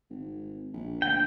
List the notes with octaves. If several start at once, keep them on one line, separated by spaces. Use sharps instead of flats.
G#1
A#1
D2 G5